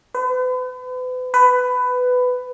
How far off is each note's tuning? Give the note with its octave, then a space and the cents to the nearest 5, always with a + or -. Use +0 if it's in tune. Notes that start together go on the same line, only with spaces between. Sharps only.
B4 +40
B4 +15